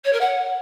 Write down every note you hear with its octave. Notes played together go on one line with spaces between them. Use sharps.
C#5
A#4
F#5